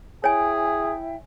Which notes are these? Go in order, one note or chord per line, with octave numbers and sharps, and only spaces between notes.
E4 G#4 C#5 E5 G5 G#5